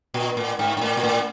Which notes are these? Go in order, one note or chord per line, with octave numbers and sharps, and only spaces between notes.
A#2
A2
G#2
G#2
A2
A#2
A2